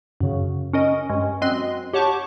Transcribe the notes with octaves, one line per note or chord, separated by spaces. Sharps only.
F#2 C#3
C#4 A#4 D#5
G2 G#3 C#4
F#2 C4 D#5 C6 F#6
G4 C#5 F#5 A5 C#6 D6